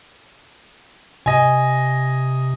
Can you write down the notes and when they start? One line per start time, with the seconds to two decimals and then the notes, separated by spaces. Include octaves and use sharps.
1.26 C3 D#5 G#5